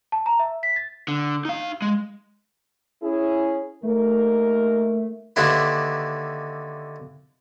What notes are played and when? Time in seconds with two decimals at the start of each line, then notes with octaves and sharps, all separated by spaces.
0.12 A5
0.26 A#5
0.39 E5
0.63 B6
0.76 A6
1.08 D3
1.45 D#4 F5
1.82 G#3
3.02 C#4 E4 G#4
3.83 D#2 A3 A#4
5.36 D#2 D3 E4 B4 C6